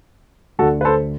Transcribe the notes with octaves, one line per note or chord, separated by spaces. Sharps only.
D2 D3 A3 F#4 A4
B4
A4 C5